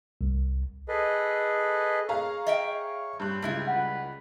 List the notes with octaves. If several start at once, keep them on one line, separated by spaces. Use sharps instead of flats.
C2
G#4 A4 B4 D#5
G#4 C#5 F5 A#5
D#5 E5 G5
G2 C4 F#6
C#2 G3 E4 F4
B4 F#5